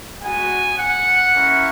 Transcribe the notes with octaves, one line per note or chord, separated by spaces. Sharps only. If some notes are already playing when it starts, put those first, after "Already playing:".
G#3 B3 F#4 G#5
F#5
A#3 C#4 E4